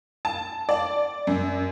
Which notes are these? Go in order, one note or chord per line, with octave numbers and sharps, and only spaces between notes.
A5
D5
F#2